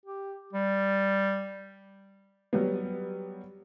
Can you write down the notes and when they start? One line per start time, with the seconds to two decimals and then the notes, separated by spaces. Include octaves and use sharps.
0.06 G4
0.53 G3
2.53 F#3 G3 B3